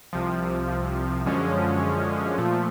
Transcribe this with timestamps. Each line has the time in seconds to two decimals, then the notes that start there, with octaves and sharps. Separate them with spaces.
0.13 C2 C3 F3
1.25 F#2 D3 F3 G#3 C#4
2.38 A#2 F3 A3